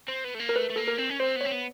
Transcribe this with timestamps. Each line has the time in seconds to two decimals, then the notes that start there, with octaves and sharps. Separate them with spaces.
0.08 C4
0.24 B3
0.35 A3
0.40 A#3
0.49 A#4
0.56 A3 B4
0.70 A3
0.76 A#3 A4
0.88 A#4
0.98 C4
1.10 C#4
1.19 C4 C5
1.36 B3
1.41 C#5
1.45 C4
1.51 B3